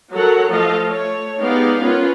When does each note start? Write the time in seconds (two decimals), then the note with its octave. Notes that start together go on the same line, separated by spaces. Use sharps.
0.13 F#3 F#4 A4 A#4 F#5 A#5
0.51 F3 A3 F4 A4 D#5 F5
0.86 A3 C#5
1.38 G#3 B3 D#4 G4 D5 F5
1.82 B3 C#4 F4 A#4 B4